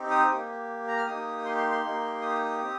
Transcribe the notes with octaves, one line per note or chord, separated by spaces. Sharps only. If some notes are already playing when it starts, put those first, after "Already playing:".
Already playing: C4 D#4 G4
D#6
A#3 G4
A#5
F6
A#3 D#4 G4 D#6
C6
C6
C6
A#3 D#4 G4
D#6
C4 G4